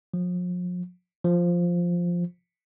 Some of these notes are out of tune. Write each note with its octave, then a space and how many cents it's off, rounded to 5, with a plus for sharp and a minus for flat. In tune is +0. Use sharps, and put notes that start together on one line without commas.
F3 +40
F3 +0